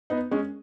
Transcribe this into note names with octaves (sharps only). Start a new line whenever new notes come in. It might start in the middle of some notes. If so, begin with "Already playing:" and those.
B3 D#4
G#3 C#4